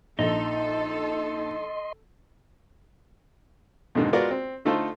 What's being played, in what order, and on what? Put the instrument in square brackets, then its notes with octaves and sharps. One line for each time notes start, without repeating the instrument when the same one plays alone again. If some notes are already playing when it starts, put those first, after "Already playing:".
[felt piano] A#1 [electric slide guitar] D#4 [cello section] A4 [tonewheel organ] D#5 C6
[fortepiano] F2 G#2 B2 D3 D#3
G#3 B3 F4 F#4 A#4 D5
C4
D3 A3 D#4 F4 A4 C5